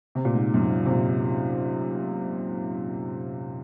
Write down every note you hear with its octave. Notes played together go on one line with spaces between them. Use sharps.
C3
A#2
G#2
F#2
G#2
C3
A#2